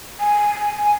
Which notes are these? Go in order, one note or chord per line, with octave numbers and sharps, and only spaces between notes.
G#5